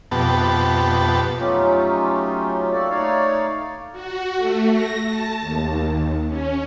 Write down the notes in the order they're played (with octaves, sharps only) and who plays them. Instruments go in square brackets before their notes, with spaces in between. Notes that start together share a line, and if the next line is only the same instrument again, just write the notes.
[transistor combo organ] F2 B2 B3 G4 A5
[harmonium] F#3 A3 C#4 D#4 F4 G4
A#3 F#4 G4 A4 D5
A3 D#4 C#5 D5 F5
[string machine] F#4
A3
A#6
A5
D#2
C#4